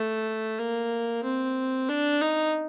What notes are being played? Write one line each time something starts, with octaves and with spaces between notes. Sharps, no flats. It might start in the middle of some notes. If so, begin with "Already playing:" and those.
Already playing: A3
A#3
C4
D4
D#4